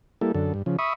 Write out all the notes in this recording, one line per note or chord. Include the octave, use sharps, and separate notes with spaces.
G3 A#3 E4 A4
F#2 D3 A4
G2
C#3 F3
E5 B5 C#6 D#6